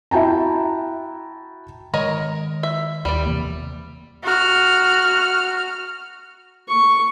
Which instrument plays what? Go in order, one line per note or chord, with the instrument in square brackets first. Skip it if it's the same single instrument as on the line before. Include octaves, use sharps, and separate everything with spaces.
[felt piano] E4 F#4 G5 A5 A#5
[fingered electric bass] D#3 G#3 [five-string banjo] A#4 C#5 D#5
[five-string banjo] E5
[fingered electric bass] D#2 [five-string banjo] G3 D5
[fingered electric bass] C3 E3 A#3
[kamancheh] F#4 F6
[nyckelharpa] C#6